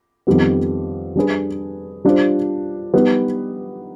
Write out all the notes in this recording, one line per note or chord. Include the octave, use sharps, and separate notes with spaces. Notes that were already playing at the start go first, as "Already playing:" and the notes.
F2 D#3 G3 B3
G3 D4 G#4 B4
G3 D4 F4 C5
G3 B3 D#4 B4